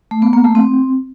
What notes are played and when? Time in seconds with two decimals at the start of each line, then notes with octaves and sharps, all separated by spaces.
0.11 A3
0.22 B3
0.33 A#3
0.44 A3
0.55 C4